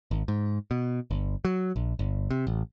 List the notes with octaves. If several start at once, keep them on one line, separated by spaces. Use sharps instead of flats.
G#1
G#2
B2
G1
F#3
A#1
G1
C3
A1